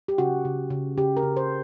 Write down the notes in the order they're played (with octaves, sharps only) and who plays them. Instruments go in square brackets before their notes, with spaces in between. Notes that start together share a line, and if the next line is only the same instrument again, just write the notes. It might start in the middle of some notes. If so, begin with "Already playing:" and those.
[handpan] G4
C#3 F#4
C#3
C#3
C#3 G4
A#4
C#3
C5